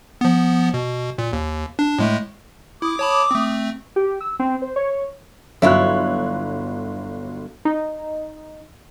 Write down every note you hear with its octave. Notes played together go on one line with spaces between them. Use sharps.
F3 B3
B2
A#2
D#2
D4
A2 G#3 A3
E4 D6 D#6
C#5 A5 B5
A3 C4
G4
E6
C4
C5
C#5
G1 F#3 E4 F4 C#5 F#6
D#4